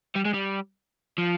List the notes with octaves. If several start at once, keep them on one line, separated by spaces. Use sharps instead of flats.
G3
G#3
G3
F3